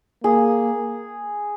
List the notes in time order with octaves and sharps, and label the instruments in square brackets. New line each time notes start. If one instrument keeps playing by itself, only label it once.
[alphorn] A#3 [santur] G#4